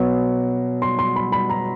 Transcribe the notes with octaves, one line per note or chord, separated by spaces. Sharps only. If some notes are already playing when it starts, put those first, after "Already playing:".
Already playing: B2 F#3 B3
C6
C6
B5
B5
A#5